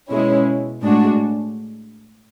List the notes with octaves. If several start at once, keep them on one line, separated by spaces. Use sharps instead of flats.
B2 G#3 C#4 E4
A2 G#3 D4 F#4